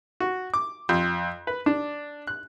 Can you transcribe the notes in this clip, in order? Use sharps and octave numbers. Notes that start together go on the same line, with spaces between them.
F#4
D6
F2
B4
D4
F#6